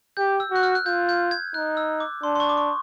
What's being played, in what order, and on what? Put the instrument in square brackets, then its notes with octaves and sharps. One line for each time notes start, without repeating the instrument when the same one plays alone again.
[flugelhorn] G4 [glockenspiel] G6
[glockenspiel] E6
[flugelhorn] F#4 [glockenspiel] F#6
[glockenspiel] F6
F#6
[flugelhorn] F4 [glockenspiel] G6
[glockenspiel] G6
G#6
[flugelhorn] D#4 [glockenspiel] F#6
[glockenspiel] E6
D6
[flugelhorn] D4 [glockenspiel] C6
[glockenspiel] C6
C#6
D6
C#6